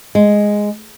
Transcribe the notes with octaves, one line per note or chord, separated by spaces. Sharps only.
G#3